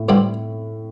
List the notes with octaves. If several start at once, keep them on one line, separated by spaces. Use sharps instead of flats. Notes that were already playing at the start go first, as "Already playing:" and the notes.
Already playing: A2
G2 D3 G3 C4 E4